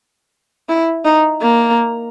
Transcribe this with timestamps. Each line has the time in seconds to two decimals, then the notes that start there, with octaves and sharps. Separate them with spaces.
0.69 E4
1.05 D#4
1.42 A#3